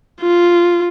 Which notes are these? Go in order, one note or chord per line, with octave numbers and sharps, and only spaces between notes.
F4